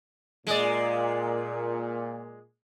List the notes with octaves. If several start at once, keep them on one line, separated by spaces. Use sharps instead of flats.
A#2 G#3 D5